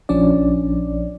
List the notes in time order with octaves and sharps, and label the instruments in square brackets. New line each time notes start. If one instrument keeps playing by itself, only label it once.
[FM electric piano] A#1 F3 C#4 D4 D5